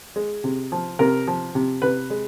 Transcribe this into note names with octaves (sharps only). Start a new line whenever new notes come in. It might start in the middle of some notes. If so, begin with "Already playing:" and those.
G#3
C3
F3
C3 A#4
F3
C3
C3 B4
G#3